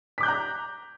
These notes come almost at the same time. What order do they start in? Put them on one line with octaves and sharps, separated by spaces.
B6 D6 G6 F#6 A#5